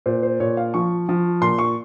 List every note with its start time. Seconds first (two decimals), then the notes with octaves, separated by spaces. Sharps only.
0.06 A#2 C5
0.23 C5
0.40 A#2 C#5
0.57 F5
0.74 F3 C#6
1.09 F3
1.41 A#2 C6
1.59 C#6